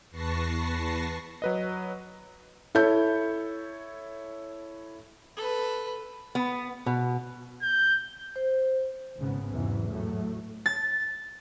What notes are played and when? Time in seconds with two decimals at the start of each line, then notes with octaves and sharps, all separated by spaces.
0.11 E2 B4 A5 C#6 A#6 C7
1.42 F#3 B4 D#5
2.75 E4 A4 C#5 G6
5.37 A4 B4
6.35 B3
6.86 B2
7.62 G6
8.36 C5
9.17 G#1 G#2 C#3 B3
9.53 E2 G#2 C3 E3 F#3
9.88 A2 F#3 A3
10.66 A6